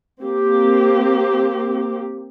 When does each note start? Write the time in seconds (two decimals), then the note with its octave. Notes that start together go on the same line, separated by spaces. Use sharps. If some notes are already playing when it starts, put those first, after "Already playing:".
0.23 A#3 C4 G4